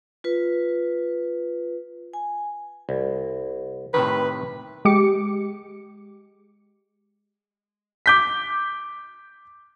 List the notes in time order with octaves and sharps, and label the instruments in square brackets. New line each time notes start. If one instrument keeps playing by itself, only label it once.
[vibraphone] F4 B4
G#5
[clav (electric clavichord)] C2
[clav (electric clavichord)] A2 C3 D#3 [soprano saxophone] B4
[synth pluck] G#3 G4 D6 C#7
[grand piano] D6 G6 B6